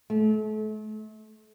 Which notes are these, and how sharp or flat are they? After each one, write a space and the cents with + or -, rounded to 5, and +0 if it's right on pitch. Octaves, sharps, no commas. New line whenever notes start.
A3 -40